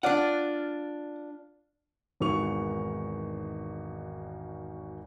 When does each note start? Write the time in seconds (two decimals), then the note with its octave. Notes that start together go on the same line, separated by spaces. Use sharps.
0.03 D4 F4 D5 F#5
2.20 G#1 E2 B2 D#3 C#6 F7